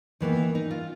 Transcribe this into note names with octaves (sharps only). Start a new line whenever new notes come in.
D#3 E3 A#3 B3
D#4
F4